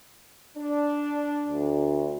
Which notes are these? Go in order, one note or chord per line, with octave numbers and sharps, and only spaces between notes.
D4
D2